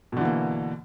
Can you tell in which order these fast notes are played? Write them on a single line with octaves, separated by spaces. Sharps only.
B2 D3 E3 A#3